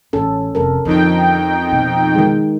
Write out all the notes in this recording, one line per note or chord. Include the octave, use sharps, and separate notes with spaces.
A1 C#4 A4
F1 F2 A4 A#4
F2 D3 D#4 G5
B2
D#3 G#3